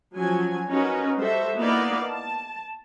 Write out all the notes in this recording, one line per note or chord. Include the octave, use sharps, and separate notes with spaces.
F3 F#3 C#4 G#5
C#4 D#4 F#4 A#4 B4
G3 F#4 A4 C5 E5
A#3 B3 D#4 E4 D5 F5
A5